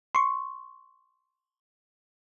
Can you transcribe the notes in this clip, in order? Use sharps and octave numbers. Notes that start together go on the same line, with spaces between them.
C6 C#6